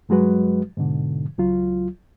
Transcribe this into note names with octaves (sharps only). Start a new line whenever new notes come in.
G2 F#3 G#3 F#4 B4
G#2 B2 D3
C#2 F#3 F4